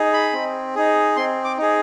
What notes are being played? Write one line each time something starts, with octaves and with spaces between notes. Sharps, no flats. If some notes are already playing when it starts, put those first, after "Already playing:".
Already playing: D#4 G#4
B5
C4
D#4 G#4
C4 C6
D6
D#4 G#4